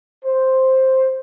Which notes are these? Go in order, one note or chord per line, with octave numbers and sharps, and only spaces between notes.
C5